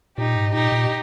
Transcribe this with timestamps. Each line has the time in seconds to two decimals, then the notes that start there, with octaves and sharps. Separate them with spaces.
0.17 A#2 D#4 G4
0.36 G#2
0.54 A#2 D#4 G4
0.72 A#2